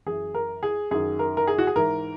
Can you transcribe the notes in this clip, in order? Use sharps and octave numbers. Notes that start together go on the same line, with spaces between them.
F#2 E3 G#4
A#4
G#4
F#2 D#3 G#4
A#4
A#4
G#4
F#4
G#4
G#2 E3 A#4